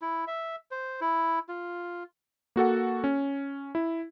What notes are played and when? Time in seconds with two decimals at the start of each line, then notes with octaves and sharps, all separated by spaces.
0.02 E4
0.27 E5
0.71 C5
1.01 E4
1.49 F4
2.56 A#3 F#4 A4 F#5
3.04 C#4
3.75 E4